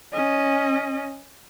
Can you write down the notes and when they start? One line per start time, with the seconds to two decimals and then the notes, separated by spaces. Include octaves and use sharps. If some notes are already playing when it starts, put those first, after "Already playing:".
0.13 C#4 D#5